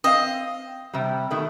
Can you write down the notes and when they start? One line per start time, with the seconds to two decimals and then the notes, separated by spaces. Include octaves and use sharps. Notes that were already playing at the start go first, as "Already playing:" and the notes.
0.04 C4 D#5 F5
0.94 C3 G3
1.31 B2 D#3 A3